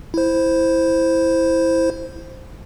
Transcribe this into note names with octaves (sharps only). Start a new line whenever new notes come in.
E4 C5